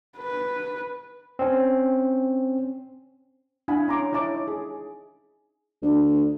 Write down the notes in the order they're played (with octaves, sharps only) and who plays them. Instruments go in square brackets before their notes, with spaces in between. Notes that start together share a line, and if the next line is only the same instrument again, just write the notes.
[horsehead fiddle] B4
[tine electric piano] C4 C#4
[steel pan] D4 E4 F5 F#5 G#5 B5
C#4 A#5 C6 D6
D#4 E4 C#5 A5 D6
G#4
[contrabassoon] D2